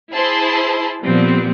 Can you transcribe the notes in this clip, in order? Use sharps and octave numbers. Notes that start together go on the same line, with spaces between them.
E4 G#4 C5 A5 B5 C6
A#2 F3 G3 B3 C4